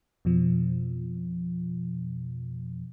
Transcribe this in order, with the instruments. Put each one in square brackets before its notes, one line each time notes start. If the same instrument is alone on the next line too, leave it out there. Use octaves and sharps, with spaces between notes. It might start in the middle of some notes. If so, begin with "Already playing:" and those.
[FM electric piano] F2 B2 F3